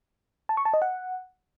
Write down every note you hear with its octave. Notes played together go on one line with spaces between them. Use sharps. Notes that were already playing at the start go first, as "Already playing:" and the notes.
A5
C#6
A5
D#5
F#5